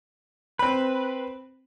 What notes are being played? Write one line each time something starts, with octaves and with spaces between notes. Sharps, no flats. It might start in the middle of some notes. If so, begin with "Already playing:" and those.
C4 B4 B5